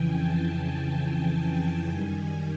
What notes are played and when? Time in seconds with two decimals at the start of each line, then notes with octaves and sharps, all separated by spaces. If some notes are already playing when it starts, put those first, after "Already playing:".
Already playing: F2 C#3 E3 G5 G#5
0.16 A5
1.30 G#5
1.88 F#2 D#3 G3